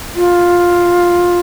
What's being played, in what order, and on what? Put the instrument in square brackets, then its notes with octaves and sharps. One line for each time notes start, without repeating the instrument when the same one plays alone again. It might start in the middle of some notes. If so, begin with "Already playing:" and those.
[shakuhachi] F4